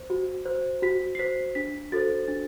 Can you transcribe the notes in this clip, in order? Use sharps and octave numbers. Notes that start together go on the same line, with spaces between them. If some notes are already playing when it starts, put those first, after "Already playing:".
Already playing: C5
F#4
C5
F#4 B6
C7
C5 B6
D4 B6
F#4 A4 C5 A6
D4 A6